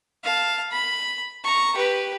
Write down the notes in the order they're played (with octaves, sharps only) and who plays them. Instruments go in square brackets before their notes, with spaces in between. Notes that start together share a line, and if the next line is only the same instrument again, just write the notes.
[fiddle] F5 A5
B5
A#5 C#6
G4 B4